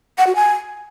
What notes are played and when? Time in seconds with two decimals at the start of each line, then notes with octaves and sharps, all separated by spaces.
0.18 F#5
0.27 F#4
0.35 G#5